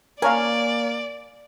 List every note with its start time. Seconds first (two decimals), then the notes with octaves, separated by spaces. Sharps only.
0.22 A#3 A#4 C#5 D5 F5 G#5